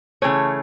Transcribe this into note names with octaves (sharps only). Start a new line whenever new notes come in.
C#3 E3 A3 C#5